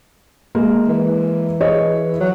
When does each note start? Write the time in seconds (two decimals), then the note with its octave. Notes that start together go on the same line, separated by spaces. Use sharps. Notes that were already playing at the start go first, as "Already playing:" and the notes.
0.55 G#3 A#3
0.87 E3
1.61 G#4 C#5 D#5
2.20 F#3